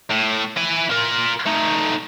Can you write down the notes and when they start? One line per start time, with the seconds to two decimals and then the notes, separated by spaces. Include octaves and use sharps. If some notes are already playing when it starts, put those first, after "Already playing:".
0.11 A2
0.57 E4 G#5
0.90 F4 A#4
1.46 A3 D#4